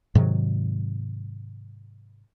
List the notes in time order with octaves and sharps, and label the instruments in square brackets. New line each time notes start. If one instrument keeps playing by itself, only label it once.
[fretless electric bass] G#2 C3 D#3 F#3